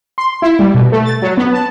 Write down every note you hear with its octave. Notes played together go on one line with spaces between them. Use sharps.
C6
E4
G3
B2
A3
A6
F#3
B3
A5